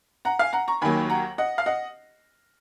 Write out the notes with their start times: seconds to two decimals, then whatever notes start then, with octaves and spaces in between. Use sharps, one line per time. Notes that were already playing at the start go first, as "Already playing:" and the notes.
0.25 F#5 A#5
0.39 F5 G#5
0.53 F#5 A#5
0.68 A#5 C#6
0.81 D#2 D#3 F#3 A#3 G#5 B5
1.10 F#5 A#5
1.38 D#5 F#5
1.58 F5
1.66 D#5 F#5